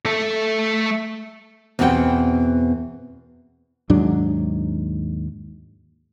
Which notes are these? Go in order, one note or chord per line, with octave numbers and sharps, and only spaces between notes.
A3 A4
E2 B2 C4 G4 F#5 G5
D#2 G#2 F#3 D4